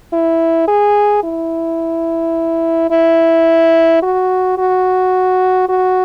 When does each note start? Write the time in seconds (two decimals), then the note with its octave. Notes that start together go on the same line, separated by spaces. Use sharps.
0.13 E4
0.68 G#4
1.23 E4
2.91 E4
4.02 F#4
4.58 F#4
5.69 F#4